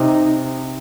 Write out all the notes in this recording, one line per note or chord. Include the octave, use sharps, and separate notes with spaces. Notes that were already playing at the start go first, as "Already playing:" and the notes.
Already playing: C3 D#4